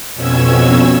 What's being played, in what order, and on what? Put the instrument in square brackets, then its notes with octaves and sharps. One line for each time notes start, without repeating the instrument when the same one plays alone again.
[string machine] F2 B2 C#4 E6 G#6